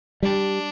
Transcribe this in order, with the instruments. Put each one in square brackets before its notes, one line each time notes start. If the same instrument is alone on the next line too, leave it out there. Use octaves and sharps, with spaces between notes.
[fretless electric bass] G3 [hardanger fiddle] D4